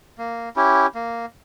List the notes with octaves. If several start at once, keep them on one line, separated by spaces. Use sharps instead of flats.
A#3
C#4 E4 G4
A#3